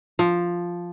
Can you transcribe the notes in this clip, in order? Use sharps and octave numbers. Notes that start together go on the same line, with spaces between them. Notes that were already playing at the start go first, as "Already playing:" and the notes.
F3